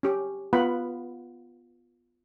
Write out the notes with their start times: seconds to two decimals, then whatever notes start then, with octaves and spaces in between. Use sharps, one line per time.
0.03 C#4 G4
0.53 B3 F4 B4 F#5 B5